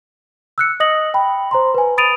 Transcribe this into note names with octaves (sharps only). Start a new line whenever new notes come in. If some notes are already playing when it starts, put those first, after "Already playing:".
E6 F#6 C#7
D#5 D#6 A#6 F#7
G5 B5
C5 A#5 C6
B4 G#5
B5 D#6 A6 D7 D#7 F7